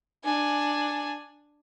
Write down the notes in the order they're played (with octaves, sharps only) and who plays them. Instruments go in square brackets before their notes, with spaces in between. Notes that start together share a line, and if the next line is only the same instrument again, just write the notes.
[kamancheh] D4 G#5